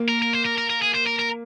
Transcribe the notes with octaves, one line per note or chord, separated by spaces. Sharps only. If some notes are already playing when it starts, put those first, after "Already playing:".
Already playing: A#3
A#4
A#4
C5
A#4
A#4
A#4
G#4
C5
A#4
A#4